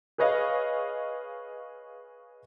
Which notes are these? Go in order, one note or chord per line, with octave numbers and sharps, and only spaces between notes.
G#4 B4 C#5 D#5 F5